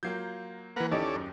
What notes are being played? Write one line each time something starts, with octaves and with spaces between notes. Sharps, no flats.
F#3 A#3 F4 G6 G#6 C7
E3 A#3 A#4 B4 F#5
D#2 C#4 D#4 E4 G4 A4 D5
F#2